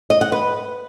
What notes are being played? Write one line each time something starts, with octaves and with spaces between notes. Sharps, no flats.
D#5
F#5
B4